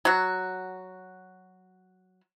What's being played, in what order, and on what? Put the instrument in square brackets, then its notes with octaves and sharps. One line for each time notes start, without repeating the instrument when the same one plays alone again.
[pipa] F#3 F#4